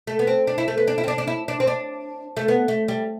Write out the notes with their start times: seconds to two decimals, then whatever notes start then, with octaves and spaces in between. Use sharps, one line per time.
0.07 A3
0.19 B3
0.27 C4
0.47 D4
0.58 E4
0.68 A3
0.78 B3
0.88 D4
0.98 E4
1.04 C4
1.08 D4
1.18 D4
1.27 E4
1.48 D4
1.60 C4
1.67 D4
2.37 A3
2.48 B3
2.68 A3
2.88 G3